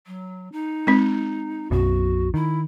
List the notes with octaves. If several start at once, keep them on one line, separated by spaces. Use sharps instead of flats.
F#3
D#4
G#3 C4
B1 F#2 B2 F#4
D#3 E4